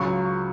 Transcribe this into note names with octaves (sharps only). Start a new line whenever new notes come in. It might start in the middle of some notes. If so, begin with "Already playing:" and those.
Already playing: C#2 C#3 F#3 C#6